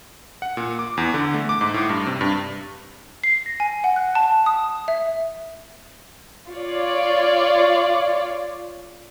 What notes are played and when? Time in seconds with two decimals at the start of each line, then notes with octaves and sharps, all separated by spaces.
0.42 F#5
0.57 A#2
0.79 D6
0.97 E2
1.14 D3
1.34 A3
1.49 D6
1.61 G#2
1.74 A2
1.89 G2
2.06 C3
2.21 G2
3.24 C7
3.46 A#6
3.60 G#5
3.84 F#5
3.96 F#6
4.15 A5
4.46 D#6
4.88 E5
6.49 F4 C#5 D5